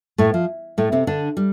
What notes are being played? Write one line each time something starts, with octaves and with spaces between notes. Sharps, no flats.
A2 A3
F3
A2 A3
C3 C4
D3 D4
G3